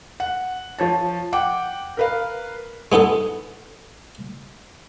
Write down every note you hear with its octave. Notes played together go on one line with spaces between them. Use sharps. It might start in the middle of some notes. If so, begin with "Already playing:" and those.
F#5
F3 C#5 A5
F#5 G5 D6
A#4 B4 F5
G#3 B3 D#4 A4